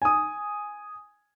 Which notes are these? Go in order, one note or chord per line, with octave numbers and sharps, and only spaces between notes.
G#5 D#6